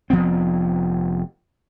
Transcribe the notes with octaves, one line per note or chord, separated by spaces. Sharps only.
F1 F3 B3 C4